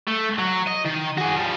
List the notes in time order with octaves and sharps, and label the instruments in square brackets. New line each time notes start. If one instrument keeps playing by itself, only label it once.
[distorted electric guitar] A3
F#3
D#5
D#3
F#4 G#4
F3 G3